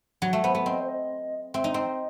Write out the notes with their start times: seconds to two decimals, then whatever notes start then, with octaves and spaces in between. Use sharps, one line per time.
0.22 F#3 F#4
0.33 A3
0.43 B3 C5
0.55 B3
0.66 C4 D#5
0.81 C5
0.88 D#5
1.54 C4 E5
1.64 D#4
1.74 C4 D#5